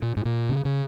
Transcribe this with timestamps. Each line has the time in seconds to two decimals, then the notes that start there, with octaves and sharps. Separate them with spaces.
0.02 A#2
0.17 G#2
0.25 A#2
0.49 C#3
0.65 C#3